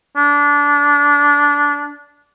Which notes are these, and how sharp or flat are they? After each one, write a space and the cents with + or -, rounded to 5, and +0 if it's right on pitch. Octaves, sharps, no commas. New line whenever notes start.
D4 -20